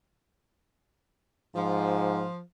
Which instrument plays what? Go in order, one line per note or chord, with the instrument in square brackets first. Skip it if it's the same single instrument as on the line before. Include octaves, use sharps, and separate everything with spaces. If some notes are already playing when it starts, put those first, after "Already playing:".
[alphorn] G#2 [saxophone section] F3